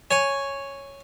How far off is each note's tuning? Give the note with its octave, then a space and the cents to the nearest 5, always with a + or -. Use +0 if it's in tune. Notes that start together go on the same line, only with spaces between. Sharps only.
C#5 +0 G#5 +0